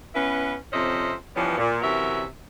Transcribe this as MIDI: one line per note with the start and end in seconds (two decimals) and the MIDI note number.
0.15 0.55 59
0.15 0.55 61
0.15 0.55 64
0.15 0.55 71
0.73 1.14 41
0.73 1.14 48
0.73 1.14 61
0.73 1.14 72
0.73 1.14 75
0.73 1.14 76
1.36 1.57 52
1.36 1.57 53
1.36 1.57 55
1.36 1.57 59
1.36 1.57 61
1.58 1.78 46
1.82 2.23 48
1.82 2.23 52
1.82 2.23 54
1.82 2.23 61
1.82 2.23 70
1.82 2.23 76